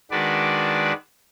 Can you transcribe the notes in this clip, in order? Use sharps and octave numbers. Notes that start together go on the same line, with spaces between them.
D#3 G#3 D4 F#4 B4 D5